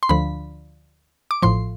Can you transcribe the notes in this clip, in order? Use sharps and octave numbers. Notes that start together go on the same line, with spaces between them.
C6
D2 D3 F3 B5
D6
A1 A2 F3 C6